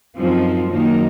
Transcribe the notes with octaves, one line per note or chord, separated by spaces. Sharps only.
F#2 F3 C4 D#4
F#2 D#3 A#3 D#4